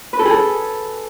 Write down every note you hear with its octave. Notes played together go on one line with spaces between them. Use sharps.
B4
A4
G#4
A4